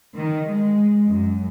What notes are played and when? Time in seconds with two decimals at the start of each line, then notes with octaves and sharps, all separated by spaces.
0.15 D#3
0.50 G#3
1.07 F#2